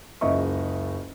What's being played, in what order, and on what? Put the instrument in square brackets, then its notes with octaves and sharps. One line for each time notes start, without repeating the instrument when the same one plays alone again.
[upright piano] F#1 C#2 D#5 E5 C#6